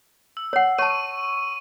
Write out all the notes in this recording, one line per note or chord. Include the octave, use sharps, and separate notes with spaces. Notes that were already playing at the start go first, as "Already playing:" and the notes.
E6
C#5 F#5
C#5 A5 C#6 E6 D#7